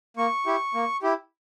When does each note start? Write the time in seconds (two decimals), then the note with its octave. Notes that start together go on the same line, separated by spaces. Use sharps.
0.17 A#3 C#6
0.46 E4 G4
0.74 A#3
1.02 E4 G4